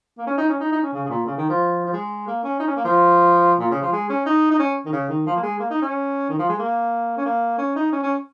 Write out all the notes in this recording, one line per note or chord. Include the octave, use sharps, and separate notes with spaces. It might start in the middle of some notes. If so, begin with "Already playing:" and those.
A#3
C#4
D#4
C#4
D#4
D#4
C#4
C#3
C#3
A#2
C#3
D#3
F3
F3
G#3
A#3
C#4
D#4
C#4
A#3
F3
A#2
C#3
F3
G#3
C#4
D#4
D#4
C#4
D#3
C#3
D#3
F3
A#3
G#3
A#3
D#4
C#4
D#3
F3
G#3
A#3
C#4
A#3
C#4
D#4
C#4
C#4